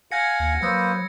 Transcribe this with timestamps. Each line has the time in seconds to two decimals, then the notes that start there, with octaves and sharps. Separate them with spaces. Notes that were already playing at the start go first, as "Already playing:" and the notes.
0.11 F5 F#5 G#5 G#6 A#6 C#7
0.40 D#2
0.62 F#3 A#3 B4 C5 B5 D#6 E6